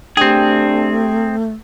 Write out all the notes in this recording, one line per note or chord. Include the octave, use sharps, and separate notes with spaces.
A3 C4 D4 G4 G#4 G5